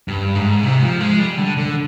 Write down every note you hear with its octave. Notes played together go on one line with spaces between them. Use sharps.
G2
G#2
C3
F3
G#3
G3
D3
D3